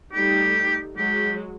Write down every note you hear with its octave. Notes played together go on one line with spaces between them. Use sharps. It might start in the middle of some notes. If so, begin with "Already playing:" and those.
G3 A3 D#4 G4
F#3 G#3 G4